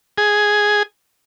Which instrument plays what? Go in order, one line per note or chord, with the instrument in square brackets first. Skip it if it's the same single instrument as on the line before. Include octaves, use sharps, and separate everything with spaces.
[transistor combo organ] G#4